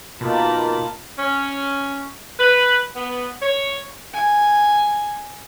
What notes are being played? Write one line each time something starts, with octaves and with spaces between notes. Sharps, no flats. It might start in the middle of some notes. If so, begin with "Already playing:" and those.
B2 A#3 D#4 F4 A#4 A5 B5
C#4
B4
B3
C#5
G#5